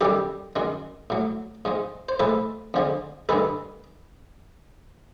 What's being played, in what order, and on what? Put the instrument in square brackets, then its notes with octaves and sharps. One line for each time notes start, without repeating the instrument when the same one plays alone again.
[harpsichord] F#2 D#3 G3 G4 A4
F#2 D#3 G#3
A2 F#3
G#2 F3 G#3
C5
A2 F3 G#3 A4 B4
F2 D3 F3 G#3
G2 D#3 G#3 A4 B4